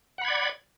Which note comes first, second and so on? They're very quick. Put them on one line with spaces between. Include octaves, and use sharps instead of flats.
F#5 B5 G#6 D5